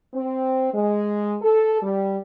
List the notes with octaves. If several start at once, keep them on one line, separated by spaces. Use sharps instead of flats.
C4
G#3
A4
G3